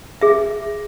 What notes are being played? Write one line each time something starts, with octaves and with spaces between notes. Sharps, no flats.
G#4 E5